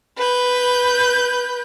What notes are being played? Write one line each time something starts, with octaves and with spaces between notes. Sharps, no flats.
B4 G6